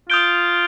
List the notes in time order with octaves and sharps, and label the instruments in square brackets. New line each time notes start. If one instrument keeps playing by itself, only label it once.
[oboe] F4 [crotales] D#6 G6 D7 G7